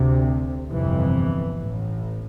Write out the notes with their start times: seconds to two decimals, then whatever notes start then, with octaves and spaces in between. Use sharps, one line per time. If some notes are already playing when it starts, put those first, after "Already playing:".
Already playing: D2 C3
0.69 G1 F2 C3 E3
1.59 A1 A2